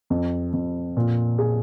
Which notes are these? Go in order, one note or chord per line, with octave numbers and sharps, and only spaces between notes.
F2
F2
A#2
G#4